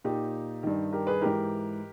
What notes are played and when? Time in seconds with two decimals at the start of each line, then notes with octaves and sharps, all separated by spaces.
0.04 A#2 D#4 G4
0.63 G2 D#3
0.92 G4 A#4
1.07 G#4 B4
1.21 G#2 E3 G4 A#4